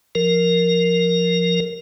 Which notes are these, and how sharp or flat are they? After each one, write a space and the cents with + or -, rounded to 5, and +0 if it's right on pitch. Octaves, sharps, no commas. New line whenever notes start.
F3 +0 A#4 +0